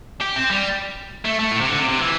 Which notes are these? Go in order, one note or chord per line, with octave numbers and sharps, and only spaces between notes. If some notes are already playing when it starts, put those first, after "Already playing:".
G4
C4
G3
A3
A3
A2
C3
D3
C3
C3
E3